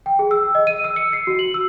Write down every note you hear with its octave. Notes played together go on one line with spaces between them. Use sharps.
G5
G#4
E6
D#5
D#7
E6
C#7
C7
F#4
F#7
E6